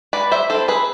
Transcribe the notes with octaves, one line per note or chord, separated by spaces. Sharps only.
G#3 B4 D5
C5 E5
C4 E4 A4 C5
G#4 B4